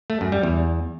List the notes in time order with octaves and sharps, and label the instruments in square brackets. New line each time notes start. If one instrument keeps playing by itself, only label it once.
[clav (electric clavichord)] A3
F#2
G3
E2